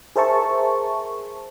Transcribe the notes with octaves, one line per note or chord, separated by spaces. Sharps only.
G#4 A#4 C5 E5 A5 C#6